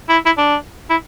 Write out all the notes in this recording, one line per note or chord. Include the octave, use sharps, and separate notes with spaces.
E4
E4
D4
E4